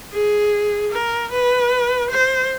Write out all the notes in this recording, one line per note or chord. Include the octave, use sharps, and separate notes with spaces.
G#4
A#4
B4
C5